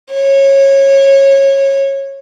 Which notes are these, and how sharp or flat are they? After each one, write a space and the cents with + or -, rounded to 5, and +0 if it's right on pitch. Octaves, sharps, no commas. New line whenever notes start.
C#5 -20